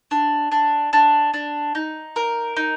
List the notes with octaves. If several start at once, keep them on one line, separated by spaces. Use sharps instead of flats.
D4
D4
D4
D4
D#4
A#4
D#4